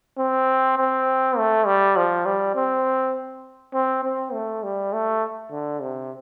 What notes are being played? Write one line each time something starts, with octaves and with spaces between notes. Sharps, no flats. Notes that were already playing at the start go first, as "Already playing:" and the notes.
C4
C4
A3
G3
F3
G3
C4
C4
C4
A3
G3
A3
D3
C3